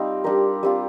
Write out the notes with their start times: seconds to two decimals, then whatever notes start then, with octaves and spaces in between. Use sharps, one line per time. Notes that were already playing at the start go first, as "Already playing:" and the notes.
Already playing: G3 C4 D#4 F4
0.24 G3 D4 G4 A#4
0.63 G3 C4 F4